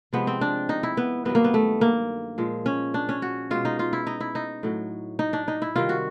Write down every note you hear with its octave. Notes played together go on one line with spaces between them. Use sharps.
C3 F3 G#3 B3
C4
D4
D#4
E4
B3
G2 D#3 F#3 B3
A#3
B3
A3
A#3
A#2 F3 G#3
C#4
D4
C#4
F#4
B2 G#3 F4
D#4
F4
E4
D#4
E4
D#4
A2 F#3
D#4
D4
D#4
E4
C3 D#3 G3 F4
F#4